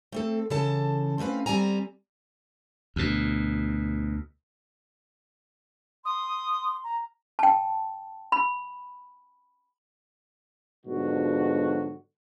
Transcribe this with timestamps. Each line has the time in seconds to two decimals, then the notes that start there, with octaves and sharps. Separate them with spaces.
0.12 A3 C4 A4
0.50 C#3 E3 A4 A5
1.18 A3 C4 C#4 B4 F5
1.46 G3 C4 G#5 A#5
2.96 D2 B2
6.05 C6 D#6
6.84 A#5
7.39 G5 A5
8.32 B5
10.86 G#2 B2 D3 F3 F#3 F#4